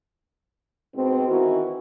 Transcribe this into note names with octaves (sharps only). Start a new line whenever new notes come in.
G#2 B2 C4
D#3 E3 F#4